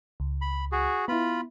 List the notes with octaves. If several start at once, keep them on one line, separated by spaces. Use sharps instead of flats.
C#2
B5
F#4 G#4
B3 E4 F4 B5